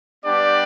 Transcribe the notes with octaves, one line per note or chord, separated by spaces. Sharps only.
G3 B3 D4 G4 D5